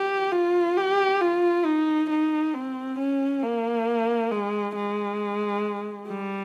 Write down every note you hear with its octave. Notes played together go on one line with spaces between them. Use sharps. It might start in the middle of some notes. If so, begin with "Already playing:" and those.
Already playing: G4
F4
G4
F4
D#4
D#4
C4
C#4
A#3
G#3
G#3
G3